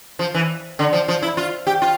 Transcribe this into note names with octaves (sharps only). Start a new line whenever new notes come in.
F3
E3
D3
F3
F3
E4
F4
G4
F4